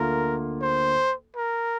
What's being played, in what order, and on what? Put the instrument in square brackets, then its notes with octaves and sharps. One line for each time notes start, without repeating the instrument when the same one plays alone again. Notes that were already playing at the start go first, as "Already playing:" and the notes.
Already playing: [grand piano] D2 D3 A#3 F4 [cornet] A#4
[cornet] C5
A#4